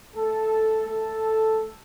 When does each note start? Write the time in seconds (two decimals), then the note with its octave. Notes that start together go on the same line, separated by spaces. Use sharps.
0.15 A3 A4
0.87 A3 A4